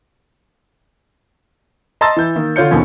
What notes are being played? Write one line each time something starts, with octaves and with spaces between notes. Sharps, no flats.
D#5 A5 A#5 C6 E6 A6
E3 G6
D#3 A#3
D3 F4 C#5 G6 C#7
D#2 B2 D3 D#3 F3 C#4